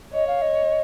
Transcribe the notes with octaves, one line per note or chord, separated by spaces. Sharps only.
C#5 D#5
F5
D#5